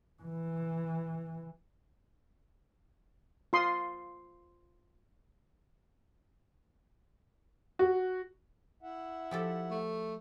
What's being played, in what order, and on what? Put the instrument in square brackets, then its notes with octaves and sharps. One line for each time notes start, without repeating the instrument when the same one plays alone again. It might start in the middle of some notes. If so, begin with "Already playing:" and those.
[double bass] E3
[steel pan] F4 C6 D#6
[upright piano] F#4
[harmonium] E4 E5 F#5
[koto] F3 G4 A4
[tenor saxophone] A3